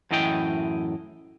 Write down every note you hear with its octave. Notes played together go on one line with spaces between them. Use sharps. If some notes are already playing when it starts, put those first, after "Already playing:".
F#2 A2 E3 E4 D#5 G5